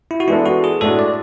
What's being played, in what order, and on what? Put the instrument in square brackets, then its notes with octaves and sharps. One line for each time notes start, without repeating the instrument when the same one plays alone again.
[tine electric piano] E4
F#4
[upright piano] E3 G#3 B3 D4 A4 [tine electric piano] E4
[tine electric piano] F#4
G#4
[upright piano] A2 G#3 D4 F#4 [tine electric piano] A4
[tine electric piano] D5